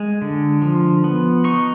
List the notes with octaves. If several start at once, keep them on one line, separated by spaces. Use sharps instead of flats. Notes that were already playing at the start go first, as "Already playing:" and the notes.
Already playing: G#3
D3
F3
B3
D#4 C#6